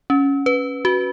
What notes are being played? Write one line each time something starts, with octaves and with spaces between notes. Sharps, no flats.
C#4
B4
F#4